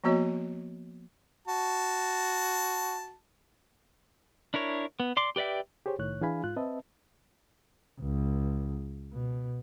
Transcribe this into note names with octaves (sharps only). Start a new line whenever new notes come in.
F3 A#3 B3 F#4 C#5 D#5
F#4 A5
D4 E4 A#4 C#5
B3
D5 C6 D6
G4 B4 D5 E5 G5
G4 G#4 C5 C#5
C2 A2 D#3 C#5 F#6
E3 D4 G#4 F5 G#5 B5
G#2 F4 F#6
C4 B4 D#5 E5 A5
C#2
B2